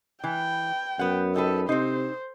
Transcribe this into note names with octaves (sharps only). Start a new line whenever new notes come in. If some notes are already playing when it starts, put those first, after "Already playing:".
E3 G5
F#2 B3 F#5
D#4 G4 A4 B4
C3 C4 D#4 C5